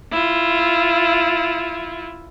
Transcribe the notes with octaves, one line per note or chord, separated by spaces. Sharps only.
E4 F4